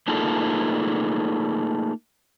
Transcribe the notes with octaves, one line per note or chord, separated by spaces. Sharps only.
A3 A#3 D#4 F4 G#4 A4